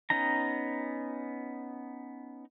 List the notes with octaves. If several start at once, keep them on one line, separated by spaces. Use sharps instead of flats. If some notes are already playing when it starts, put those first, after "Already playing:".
B3 C#4 D#4 A#5